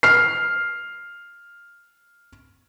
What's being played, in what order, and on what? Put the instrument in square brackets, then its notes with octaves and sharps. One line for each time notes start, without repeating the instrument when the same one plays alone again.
[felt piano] F6 C7